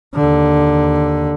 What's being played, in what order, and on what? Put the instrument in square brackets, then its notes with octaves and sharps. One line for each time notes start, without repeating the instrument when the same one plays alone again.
[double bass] D#2 D3